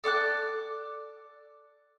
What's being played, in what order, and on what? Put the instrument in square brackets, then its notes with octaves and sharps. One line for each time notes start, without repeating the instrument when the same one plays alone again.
[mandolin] A4 D5 D6 F#6